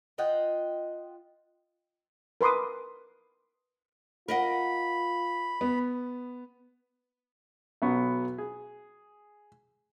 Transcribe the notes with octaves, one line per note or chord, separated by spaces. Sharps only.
F4 D#5 F#5 G5
A#4 B4 C6 D6 D#6
F4 A#4 D#5 F#5 B5
B3
B1 F#3 B3 C#6
G#4